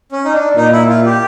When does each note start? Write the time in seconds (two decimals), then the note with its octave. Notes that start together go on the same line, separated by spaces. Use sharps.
0.12 C#4
0.25 D#4
0.33 D4
0.56 A#2 D#4
0.72 E4
0.89 F4
1.06 G4